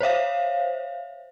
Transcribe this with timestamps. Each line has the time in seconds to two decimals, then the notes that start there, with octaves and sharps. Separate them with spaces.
0.01 C5 C#5 E5 F5